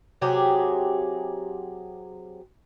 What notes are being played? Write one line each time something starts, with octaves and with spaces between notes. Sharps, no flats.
C3 F#3 G4 G#4